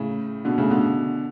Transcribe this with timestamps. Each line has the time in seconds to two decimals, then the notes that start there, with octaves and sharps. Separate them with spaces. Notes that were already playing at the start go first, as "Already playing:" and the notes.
Already playing: A2 C#3
0.45 B2 D3
0.58 A2 C#3
0.70 B2 D3